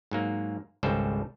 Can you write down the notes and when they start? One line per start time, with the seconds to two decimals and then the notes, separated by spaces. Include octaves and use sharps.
0.11 G#2 F#3 A#3
0.83 G#1 C#2 G3 G#4 A4 C5